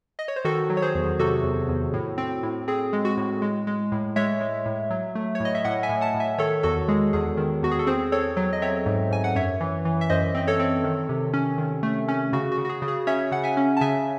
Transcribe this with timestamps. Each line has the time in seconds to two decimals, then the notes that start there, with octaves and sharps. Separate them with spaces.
0.19 D#5
0.28 C#5
0.36 C5
0.45 D#3 F#4 A4
0.70 F#3
0.77 C#5
0.82 G#4 C5
0.95 E2
1.19 C3 F#4 A4
1.43 E2
1.69 E2
1.94 A2
2.18 C4
2.43 A2
2.68 C4 G#4
2.93 G#3
3.05 F#4
3.17 A2
3.42 G#3
3.67 G#3
3.92 A2
4.16 G#3 C#5 E5
4.41 G#3
4.66 A2
4.90 F#3
5.15 A3
5.35 C#5
5.40 A2 D#5
5.55 E5
5.64 A2 D#5 F#5
5.83 E5 G#5
5.89 A2
6.01 F#5 A5
6.14 A2
6.20 E5 G#5
6.38 D#3 A4 C#5
6.63 E2 F#4 A4
6.88 G#3 G#4
7.13 E2 G#4
7.37 D#3
7.63 E2 F#4
7.71 G#4
7.79 A4
7.87 C4 G#4 C5
8.12 C4 A4 C#5
8.37 F#3
8.53 D#5
8.62 C4 C#5 E5
8.86 G#2
9.11 G#2 G#5
9.24 F#5
9.35 F#2 C#5 E5
9.60 E3
9.85 E3
10.01 E5
10.10 F#2 C5 D#5
10.35 C4 D#5
10.47 A4 C#5
10.60 C4
10.84 D#3
11.09 C3
11.33 C#4
11.58 D#3
11.83 A3
12.08 C#4
12.33 C#3 F#4
12.52 F#4
12.58 C#3
12.65 F#4
12.69 G#4
12.82 C#3
12.88 G#4
13.07 C#4 C#5 E5
13.31 C#3 F#5
13.44 E5 G#5
13.57 C#4
13.77 A5
13.81 C#3 E5 G#5